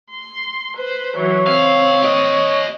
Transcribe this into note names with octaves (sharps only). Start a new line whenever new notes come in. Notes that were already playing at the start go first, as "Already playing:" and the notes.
C6
B4 C5
E3 F#3 C#5
C#2 C4 F5
G4 D#5